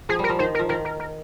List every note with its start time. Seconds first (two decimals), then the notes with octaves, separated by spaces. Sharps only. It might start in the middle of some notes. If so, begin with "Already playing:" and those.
0.09 F3 G#4
0.19 G3 A#4
0.29 F3
0.39 D#3 C5
0.55 A#4
0.59 F3
0.69 D#3 A#4
0.85 A#4
1.00 A#4